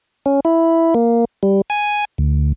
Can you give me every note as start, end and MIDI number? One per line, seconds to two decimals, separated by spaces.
0.26 0.40 61
0.45 0.94 64
0.94 1.25 58
1.43 1.61 55
1.70 2.05 80
2.18 2.53 38